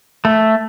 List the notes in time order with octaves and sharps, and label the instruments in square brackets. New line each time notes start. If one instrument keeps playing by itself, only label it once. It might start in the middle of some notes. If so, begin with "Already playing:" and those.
[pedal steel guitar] A3